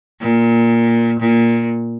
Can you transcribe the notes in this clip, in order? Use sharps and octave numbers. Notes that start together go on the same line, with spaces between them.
A#2
A#2